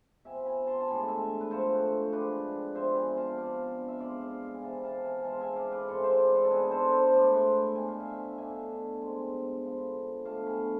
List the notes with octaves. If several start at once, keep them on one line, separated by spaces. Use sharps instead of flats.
C3 F3 B3 E5 G#5
G#5 B5
A5 C6
A5
A2 G#3 D4 G#5 B5
E5 G#5
B4
D3 F3 A3 C4 A4 C5
C3 G#3 D4 B4 D5
C3 F3 B3 C5 E5
G#5 B5
F5 A5
C3 F3 B3 D4 D5 F5
E5
B2 G#3 B3 D5 F5
D5 F5
F5
G#5
C3 E3 B3 F5 A5
F5 A5
G#5 B5
G#5
C3 E3 G#3 B3 F5 A5
E5 G#5
D5 F5
B4 D5
G#2 E3 G#3 A4 C5
C5 E5
B4 D5
A4 C5
A4
B2 B3 D4 G#4 B4
A4 C5
A4 C5
C5
A2 G#3 D4 B4 D5
C5 E5
B2 A3 D4 G#5
F5
E5 G#5
B2 A3 D4 E5 G#5
B2 G#3 C4
D3 F3 B3
B2 A3 D4 F5 A5
G#5 B5